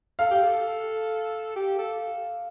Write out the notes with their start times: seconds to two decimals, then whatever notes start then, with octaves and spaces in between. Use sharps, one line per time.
0.19 A4 F5
0.31 G4
0.43 A4
1.56 G4
1.79 A4